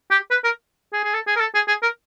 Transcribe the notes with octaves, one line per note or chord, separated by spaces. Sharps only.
G4
B4
A#4
G#4
G#4
A4
G#4
A#4
A4
G#4
G#4
A#4